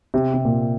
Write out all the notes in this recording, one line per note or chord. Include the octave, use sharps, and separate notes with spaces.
C3
C3
A#2